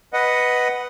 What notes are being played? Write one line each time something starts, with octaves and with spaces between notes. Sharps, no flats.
B4 D#5 F#5